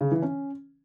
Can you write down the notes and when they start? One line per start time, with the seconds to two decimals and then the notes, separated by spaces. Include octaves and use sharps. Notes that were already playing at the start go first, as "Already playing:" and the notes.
0.01 C#3
0.11 E3
0.22 C#4